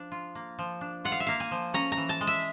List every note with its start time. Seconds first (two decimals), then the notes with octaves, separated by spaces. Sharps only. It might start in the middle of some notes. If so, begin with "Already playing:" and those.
Already playing: F3 D4
0.12 F4
0.35 A#3
0.59 F3
0.81 D4
1.04 F4 F#5
1.12 F5
1.20 E5
1.27 A#3 F5
1.40 G#5
1.51 F3
1.74 C#4 A#5
1.92 A#5
1.97 E3
2.09 A5
2.21 G#3
2.27 E5